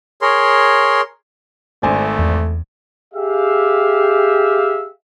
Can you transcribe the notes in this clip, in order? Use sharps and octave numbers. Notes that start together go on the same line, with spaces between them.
G#4 A#4 C#5 C6
G#1 A3 C5 D5 G#5
E2
G4 G#4 E5 F5